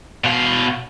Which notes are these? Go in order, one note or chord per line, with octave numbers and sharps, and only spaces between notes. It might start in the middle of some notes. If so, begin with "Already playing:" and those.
B2 F5